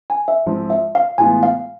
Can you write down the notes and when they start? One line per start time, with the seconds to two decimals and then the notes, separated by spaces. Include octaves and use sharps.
0.10 G#5
0.28 E5
0.46 G#2 F3 G#3 C4 E4
0.70 E5
0.95 F5
1.18 A2 E3 G#3 B3 F4 G#5
1.43 F5